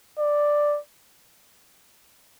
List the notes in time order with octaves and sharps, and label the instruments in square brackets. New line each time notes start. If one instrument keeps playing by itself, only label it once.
[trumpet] D5